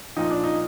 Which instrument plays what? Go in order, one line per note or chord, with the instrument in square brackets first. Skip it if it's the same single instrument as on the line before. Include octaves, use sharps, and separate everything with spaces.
[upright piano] A#2 F3 D#4
D4
D#4